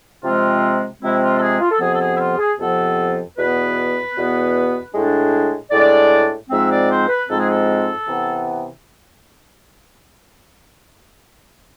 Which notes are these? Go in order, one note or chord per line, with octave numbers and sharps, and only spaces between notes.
C3 F3 G#3 C4 F4
C3 F3 G#3 C4 E4
F4
A4
G#4
F4
A4
F2 C3 F3 B3 G#4
A4
G#4
E4
F4
G#4
F2 C3 F3 B3 A4
E2 B2 B3 B4
E2 B2 B3
A2 G#3 D4
A2 G#3 D4 D5
G#2 F3 G#3 C4 E5
D5
C5
B4
G#2 F3 G#3 C4 A4
G#4
A4
C3 E3 B3